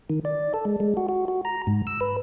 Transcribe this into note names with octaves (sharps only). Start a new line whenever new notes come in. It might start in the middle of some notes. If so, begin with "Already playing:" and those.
D#3
D5
A4
G#3
G#3
F#4
F#4
F#4
A#5
G#2
E6
B4